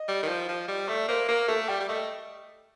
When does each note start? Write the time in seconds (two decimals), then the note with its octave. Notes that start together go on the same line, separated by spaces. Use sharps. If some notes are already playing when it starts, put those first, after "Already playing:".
Already playing: D#5
0.08 G3
0.23 D#3
0.28 F3
0.49 F3
0.68 G3
0.89 A3 D5
1.08 A#3 C5
1.29 A#3 A#4
1.48 A3 A4
1.68 G3 G5
1.80 G3
1.89 A3 D#5